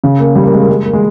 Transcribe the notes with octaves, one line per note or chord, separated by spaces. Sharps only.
C#3
A#3
G3
A#3
G#3
A#3
G#3
A#3
G#3